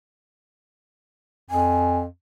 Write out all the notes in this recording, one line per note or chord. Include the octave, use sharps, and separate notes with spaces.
F2 G#5